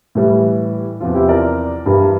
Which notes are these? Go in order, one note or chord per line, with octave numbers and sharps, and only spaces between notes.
A2 E3 G3
E2 C3 F3 F4
E4 G4
A#4 D5
G2 E3 G3 G4 A#4